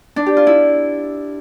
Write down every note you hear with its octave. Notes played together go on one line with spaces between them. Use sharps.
D4
G4
F4
E4